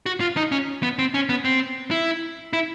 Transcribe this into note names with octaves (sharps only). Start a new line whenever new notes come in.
F#4
F4
D#4
C#4
B3
C4
C#4
B3
C4
E4
E4